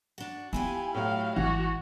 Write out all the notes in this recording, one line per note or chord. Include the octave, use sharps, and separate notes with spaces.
D4 F#4
B3 E4 F4 G4 G#5
A2 F#3 F5
G#1 E3 F#4